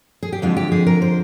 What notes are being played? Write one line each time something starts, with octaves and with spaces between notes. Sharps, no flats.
G#4
G4
F2 D3 F3 G#3 F4
G4
G#4
A#4
C5